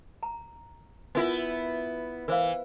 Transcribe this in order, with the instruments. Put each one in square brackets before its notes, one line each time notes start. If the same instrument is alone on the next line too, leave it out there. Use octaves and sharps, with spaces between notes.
[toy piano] A#5
[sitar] B3 E4 [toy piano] F4 A#4 G#5
[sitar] E3 [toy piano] A#4 C5 F5